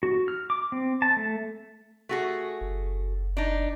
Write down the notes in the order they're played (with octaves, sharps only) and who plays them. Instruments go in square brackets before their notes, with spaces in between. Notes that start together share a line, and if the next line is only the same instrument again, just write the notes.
[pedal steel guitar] F#4
F6
D6
C4
A5
A3
[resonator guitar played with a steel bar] A3 F#4 G#4
[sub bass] F#1
[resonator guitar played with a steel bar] D4 D#4